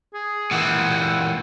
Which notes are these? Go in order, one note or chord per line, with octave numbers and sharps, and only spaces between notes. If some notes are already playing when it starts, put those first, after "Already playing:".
G#4
A#2 E3 F#5